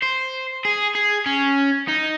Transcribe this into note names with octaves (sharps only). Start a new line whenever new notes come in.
C5
G#4
G#4
C#4
D#4